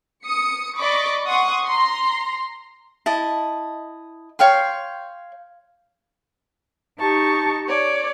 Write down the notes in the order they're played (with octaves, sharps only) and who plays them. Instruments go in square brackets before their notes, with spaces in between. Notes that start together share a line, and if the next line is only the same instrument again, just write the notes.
[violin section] D#6 C#7
D5 D#5 B5 C#6 D6
F#5 C6 C#6 D#6
A#5 C6
[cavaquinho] E4 D#5 A5
C#5 F5 G5 C6
[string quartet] D#4 G4 A5 C#6
C#5 D5